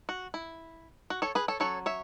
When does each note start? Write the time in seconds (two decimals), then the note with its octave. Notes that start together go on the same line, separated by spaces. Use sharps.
0.09 F#4
0.34 E4
1.10 F#4
1.22 A4 C#5
1.35 G#4 B4
1.48 A4 C#5
1.60 F#3 C#4 A4 C#5
1.86 C#5 E5